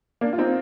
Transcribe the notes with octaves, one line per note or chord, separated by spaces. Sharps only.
A#3 D4
F4
C4 D#4